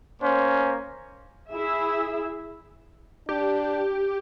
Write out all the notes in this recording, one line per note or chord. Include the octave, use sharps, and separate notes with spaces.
A#3 C#4 C5
E4 G#4 E5
D4 G4